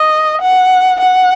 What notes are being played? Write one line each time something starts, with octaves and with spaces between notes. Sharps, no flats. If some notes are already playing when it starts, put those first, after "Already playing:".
Already playing: D#5
F#5
F#5